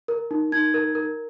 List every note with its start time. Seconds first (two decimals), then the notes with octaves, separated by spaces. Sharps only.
0.08 A#4
0.31 D#4
0.52 D#4 G#6
0.74 A#4
0.95 A#4